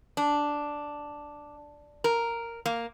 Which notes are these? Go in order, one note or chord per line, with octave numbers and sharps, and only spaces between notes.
D4
A#4
A#3